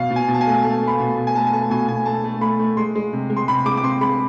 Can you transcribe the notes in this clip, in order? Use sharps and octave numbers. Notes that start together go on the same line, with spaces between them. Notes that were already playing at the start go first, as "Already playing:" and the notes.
Already playing: B2 F5
B2
G#5
B2
A5
G#5
A3
A3 A5
A3
B5
B2
B2
G#5
A3 A5
G#5
A3 A5
B2 G#5
B2 G#5
A3 A5
A3
A3 B5
A3
G#3 C6
G#3
C3
G#3
C6
C3 B5
G#3 D6
D6
C3 C6
G#3 B5